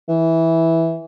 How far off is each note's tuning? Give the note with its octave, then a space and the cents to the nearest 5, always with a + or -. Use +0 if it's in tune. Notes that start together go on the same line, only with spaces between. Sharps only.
E3 -10